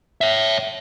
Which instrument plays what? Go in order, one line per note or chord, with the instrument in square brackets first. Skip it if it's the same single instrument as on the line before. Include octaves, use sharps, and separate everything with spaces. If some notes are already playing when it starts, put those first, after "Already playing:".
[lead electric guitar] C#5 E5